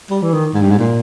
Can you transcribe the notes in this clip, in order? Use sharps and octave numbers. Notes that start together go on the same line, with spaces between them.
G3
E3
D#3
G#2
G2
G#2
A#2